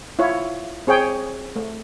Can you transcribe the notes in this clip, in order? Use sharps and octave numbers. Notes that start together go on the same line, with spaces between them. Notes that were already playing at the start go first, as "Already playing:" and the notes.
E4 F4 C#5
C4 G#4 C#5 G5
A3